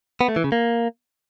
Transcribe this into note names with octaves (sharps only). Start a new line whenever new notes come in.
B3
A3
E3
C#3
A#3